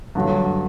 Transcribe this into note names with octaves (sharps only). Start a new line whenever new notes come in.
G2 D3 F#3